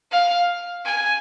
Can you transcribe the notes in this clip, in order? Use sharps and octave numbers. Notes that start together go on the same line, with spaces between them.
F5
G#5